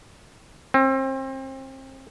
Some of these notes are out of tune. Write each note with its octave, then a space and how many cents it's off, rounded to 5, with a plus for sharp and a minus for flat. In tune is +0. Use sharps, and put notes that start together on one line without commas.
C4 +30